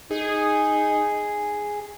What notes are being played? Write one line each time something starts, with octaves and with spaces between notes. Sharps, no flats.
D#4 G#4